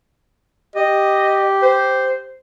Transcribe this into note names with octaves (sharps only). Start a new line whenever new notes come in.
G4 D#5
C5